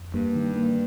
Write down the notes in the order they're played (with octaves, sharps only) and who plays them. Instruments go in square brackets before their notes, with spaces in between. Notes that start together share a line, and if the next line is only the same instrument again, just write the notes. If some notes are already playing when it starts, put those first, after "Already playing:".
Already playing: [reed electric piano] F2
[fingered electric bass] G2 [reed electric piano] A#3
[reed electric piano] D#3
A#3